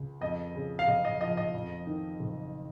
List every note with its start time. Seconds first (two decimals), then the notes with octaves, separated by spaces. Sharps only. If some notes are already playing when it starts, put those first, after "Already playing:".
Already playing: C#2
0.21 F2 D#5
0.55 C#3
0.79 F5
0.88 F#1 D#5
1.05 D#5
1.21 F3 D#5
1.37 D#5
1.54 F2
1.87 D#3
2.20 F#1